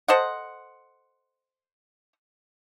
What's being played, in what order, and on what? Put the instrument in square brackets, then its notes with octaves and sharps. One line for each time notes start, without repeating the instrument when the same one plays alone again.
[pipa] A4 C5 D#5 F#5